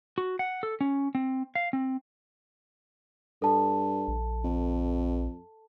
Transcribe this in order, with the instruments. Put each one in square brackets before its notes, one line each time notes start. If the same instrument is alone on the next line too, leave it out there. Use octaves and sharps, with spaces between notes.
[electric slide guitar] F#4
F#5
A4
C#4
C4
F5
C4
[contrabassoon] G2 [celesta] A4 A5
[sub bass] A#1
[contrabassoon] F2